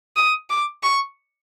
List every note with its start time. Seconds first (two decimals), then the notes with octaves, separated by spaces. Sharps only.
0.16 D#6
0.50 D6
0.83 C#6